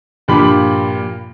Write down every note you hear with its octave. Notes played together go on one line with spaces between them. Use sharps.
G2 A#2 F3 G4 B5 F#7